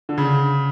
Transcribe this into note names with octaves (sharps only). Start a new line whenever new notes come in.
D3
C#3